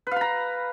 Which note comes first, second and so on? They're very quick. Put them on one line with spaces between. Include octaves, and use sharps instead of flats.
B4 F5 B5 A#5